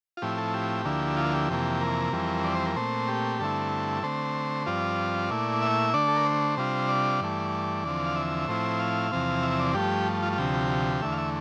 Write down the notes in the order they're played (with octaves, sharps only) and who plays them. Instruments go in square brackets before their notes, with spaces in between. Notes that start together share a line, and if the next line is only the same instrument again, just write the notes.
[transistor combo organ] F4
A2 F3 C4 E4 G4
A4
G4
D2 D3 F3 A#3 E4
F4
G4
F2 C3 E3 A#3
A#4
F2 E3 G3 C4
D5
C5
A#4
A#2 A3 C4 C5
G4
G2 D3 A3 C4 E4 A4
D3 A3 C4 C5
G2 F3 C4 F4 D5
A#2 A3 E4
E5
D3 A3 D4 D5
A4
A#4
C5
C3 G3 D4 F4
D5
G2 E3 A3
E2 D3 F3 C4
F5
E5
A2 F3 C4 E4 C5
F5
E2 C3 F3 C4
E5
D5
G2 F3 A3 G4
F4
F4
D2 C3 F3 G4
E2 D3 A3 E5
F5
E5